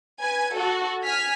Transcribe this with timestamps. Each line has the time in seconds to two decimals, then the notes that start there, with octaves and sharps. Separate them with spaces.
0.20 B4 G#5
0.55 F#4 A4
1.04 G#5 F6 B6